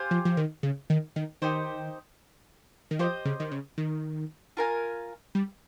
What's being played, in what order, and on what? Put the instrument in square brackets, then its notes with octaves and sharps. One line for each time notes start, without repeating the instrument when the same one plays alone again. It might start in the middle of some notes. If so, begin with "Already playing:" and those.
Already playing: [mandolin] G4 C5 F5 G#5
[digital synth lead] F3
F3
D#3
C#3
D#3
D#3
[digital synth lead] D#3 [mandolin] D#4 G4 C5
[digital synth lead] D#3
[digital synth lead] F3 [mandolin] G4 C5 D#5
[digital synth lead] C#3
D#3
C#3
D#3
[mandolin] F4 A#4 F5 G#5
[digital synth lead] G3